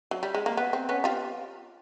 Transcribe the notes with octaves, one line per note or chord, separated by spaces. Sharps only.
F#3
G3
G#3
A#3
B3
C4
B3 C#4
F4 G4